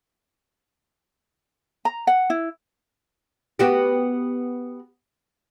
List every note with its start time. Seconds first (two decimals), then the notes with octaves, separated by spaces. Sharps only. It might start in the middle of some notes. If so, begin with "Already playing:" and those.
1.85 A#5
2.07 F#5
2.30 E4
3.59 B3 F#4 G4